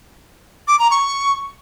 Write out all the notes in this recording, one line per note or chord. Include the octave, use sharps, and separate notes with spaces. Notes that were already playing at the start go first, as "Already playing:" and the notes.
D6
A#5
C#6